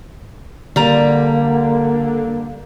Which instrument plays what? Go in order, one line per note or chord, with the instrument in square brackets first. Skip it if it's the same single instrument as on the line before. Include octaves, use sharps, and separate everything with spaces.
[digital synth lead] D3 [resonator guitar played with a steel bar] G3 A#5 [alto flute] A#3